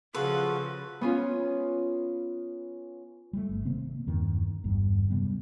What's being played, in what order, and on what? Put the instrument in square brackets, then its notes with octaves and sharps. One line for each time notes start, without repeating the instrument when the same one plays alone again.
[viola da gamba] C#3 F3 [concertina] F4 F#4 A4 [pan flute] G#4 [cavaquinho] B4
[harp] B3 C#4 F4
[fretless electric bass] G3 A3
G1
C3 D#3 A#3 C4
E2 G2 D#3
G1 E2 G2 G3
F#2 C3 G3 B3